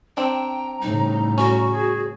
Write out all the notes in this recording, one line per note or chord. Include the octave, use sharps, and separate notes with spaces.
C4 D4 G5 A#5
A2 C#3 G3 D#4
C#4 F#4
G#4